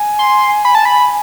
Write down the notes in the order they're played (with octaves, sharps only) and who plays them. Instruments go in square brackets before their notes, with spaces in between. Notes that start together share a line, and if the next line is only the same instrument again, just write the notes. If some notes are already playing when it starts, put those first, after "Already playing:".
Already playing: [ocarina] G#5
[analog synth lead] C6
B5
A5
B5